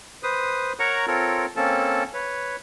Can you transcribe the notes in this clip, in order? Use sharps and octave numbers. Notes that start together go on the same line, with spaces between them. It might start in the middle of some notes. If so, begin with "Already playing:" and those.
B4 C5 D#6
A#4 C#5 F#5 A#5 C#6
C4 F4 A4 A#4 C#5
A#3 C4 C#4 A4 A5
B4 C#5